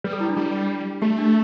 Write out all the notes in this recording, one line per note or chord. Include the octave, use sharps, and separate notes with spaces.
G3 B4
A4
E4
D4
G3 E4
A3 G4
D4